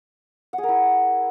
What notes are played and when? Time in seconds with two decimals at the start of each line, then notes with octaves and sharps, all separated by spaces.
0.53 F#5
0.58 G#4
0.63 A#4
0.68 E4